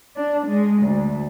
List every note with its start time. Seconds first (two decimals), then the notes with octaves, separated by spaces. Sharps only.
0.16 D4
0.47 G#3
0.83 D2